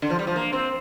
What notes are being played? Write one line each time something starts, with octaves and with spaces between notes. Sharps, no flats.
D3
F3
G3
F3
A#3
C4